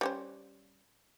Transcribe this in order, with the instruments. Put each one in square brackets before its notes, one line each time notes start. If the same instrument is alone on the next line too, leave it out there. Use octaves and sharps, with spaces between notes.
[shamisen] G3 C#4 C5